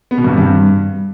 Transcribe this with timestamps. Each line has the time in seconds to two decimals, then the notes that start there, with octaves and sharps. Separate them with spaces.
0.11 B3
0.18 B2
0.24 G2
0.31 C3
0.38 G2